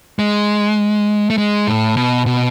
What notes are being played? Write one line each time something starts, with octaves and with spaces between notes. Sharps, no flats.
G#3
A3
G#3
A2
B2
B2